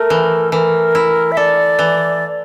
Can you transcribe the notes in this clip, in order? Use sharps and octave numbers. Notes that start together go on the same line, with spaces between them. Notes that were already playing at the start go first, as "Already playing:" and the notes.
Already playing: A3 A#4
E3
E3 A#4
E4
E5
A4 D5
E3